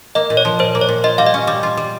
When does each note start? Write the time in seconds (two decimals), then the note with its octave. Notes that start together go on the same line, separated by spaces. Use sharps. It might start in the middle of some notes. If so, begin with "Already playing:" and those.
0.15 A#3 D#5
0.30 A#2
0.37 C#5
0.45 F3
0.59 A#2 C5
0.75 A#3
0.81 C#5
0.89 A#2
1.04 F4 D#5
1.18 G3 F5
1.26 D#5
1.34 C#4
1.47 G3
1.63 F4
1.77 G3